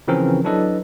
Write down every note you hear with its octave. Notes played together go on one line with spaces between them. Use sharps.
C#3 E3 F3 C4 C#4 A#4
F#3 D4 E4 A4 B4 D#5